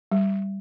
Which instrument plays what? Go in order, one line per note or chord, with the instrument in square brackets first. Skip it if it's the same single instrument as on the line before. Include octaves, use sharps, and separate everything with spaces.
[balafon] G3